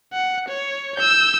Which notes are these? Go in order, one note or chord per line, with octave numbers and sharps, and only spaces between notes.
F#5
C#5
E6 G6